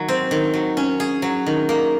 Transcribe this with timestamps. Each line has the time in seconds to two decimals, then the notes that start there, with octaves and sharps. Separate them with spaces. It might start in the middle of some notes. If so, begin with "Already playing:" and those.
Already playing: D#3 F#3 A#3
0.08 C4
0.31 D#3
0.54 F#3
0.77 C#4
1.00 G#4
1.22 F#3
1.46 D#3
1.69 A#3